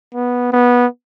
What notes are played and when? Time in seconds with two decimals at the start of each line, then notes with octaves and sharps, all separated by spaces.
0.15 B3
0.53 B3